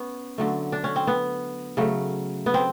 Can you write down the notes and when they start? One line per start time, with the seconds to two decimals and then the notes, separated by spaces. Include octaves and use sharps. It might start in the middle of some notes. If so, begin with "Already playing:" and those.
Already playing: B3 C#4
0.38 D3 F#3 A3
0.72 D4
0.84 C#4
0.96 C4
1.07 B3
1.77 C#3 F#3 A3
2.46 B3
2.54 C4